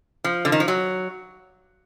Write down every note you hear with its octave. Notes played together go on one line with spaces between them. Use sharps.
F3
D3
D#3
F3
F#3